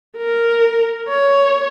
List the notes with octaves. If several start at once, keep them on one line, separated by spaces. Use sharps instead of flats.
A#4
C#5